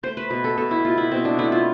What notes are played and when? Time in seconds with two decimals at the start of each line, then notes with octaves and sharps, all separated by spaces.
0.03 A3 C5
0.17 B4
0.30 B2 B4
0.44 A4
0.57 B2 A4
0.71 E4
0.85 B2 F4
0.98 E4
1.11 B2 C4
1.25 D4
1.38 A3 E4
1.52 F4